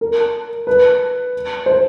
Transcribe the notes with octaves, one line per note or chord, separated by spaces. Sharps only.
A#4
B4
C5